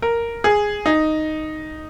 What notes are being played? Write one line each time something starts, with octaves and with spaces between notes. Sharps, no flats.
A#4
G#4
D#4